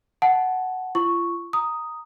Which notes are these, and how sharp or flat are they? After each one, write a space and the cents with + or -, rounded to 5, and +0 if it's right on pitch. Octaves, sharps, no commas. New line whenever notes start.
F#5 +0 A5 -15
F4 -35 C#6 +0
A#5 +0 D#6 +0